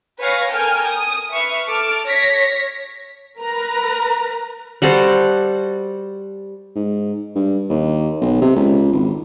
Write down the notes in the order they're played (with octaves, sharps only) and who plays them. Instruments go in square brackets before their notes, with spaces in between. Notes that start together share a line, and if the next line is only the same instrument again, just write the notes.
[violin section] B4 C#5 F5 G#5 C#6 A#6
A4 A#4 G5 G#5 F6
D#6
B4 E5 C#6 F6
A4 A5 D6 F6
C#5 A#6 B6
[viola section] A#4 B4 A#5
[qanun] G3 F#4 A4 C5
[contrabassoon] G#2
G2
D#2
B1
C3
C#2
G#1